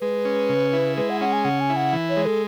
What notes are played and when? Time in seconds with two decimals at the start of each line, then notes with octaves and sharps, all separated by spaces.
0.01 G#3 B4
0.25 C#4
0.49 C#3
0.73 E4
0.97 G#3 B4
1.10 F#5
1.21 C#4 F#5
1.33 G#5
1.45 C#3 F#5
1.60 G#5
1.70 E4
1.76 F#5
1.93 E3
2.09 C#5
2.17 G#3
2.25 A4